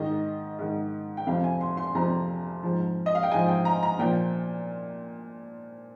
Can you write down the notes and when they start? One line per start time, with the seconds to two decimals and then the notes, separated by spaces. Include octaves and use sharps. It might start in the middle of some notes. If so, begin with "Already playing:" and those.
Already playing: G#2 D#3 D#5
0.59 G#2 D#3
1.17 G5
1.27 F2 C3 F3 F5
1.44 G#5
1.61 C6
1.77 C6
1.95 F2 C3 F3 A#5
2.63 G#2 F3
3.06 D#5
3.15 F5
3.23 G5
3.32 G#2 F3 G#5
3.48 G5
3.65 A#5
3.83 A#5
3.99 A#2 F3 G5